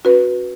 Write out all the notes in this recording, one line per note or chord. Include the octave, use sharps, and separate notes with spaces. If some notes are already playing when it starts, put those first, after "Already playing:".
C#4 F#4 B4